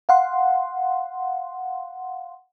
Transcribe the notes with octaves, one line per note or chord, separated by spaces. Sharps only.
F5 F#5 C6